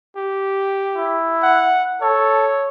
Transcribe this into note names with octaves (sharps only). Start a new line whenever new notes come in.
G4
E4
F#5
A4 C#5